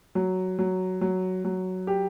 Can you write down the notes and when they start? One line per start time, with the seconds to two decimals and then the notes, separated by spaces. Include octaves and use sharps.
0.15 F#3
0.59 F#3
1.01 F#3
1.45 F#3
1.87 G4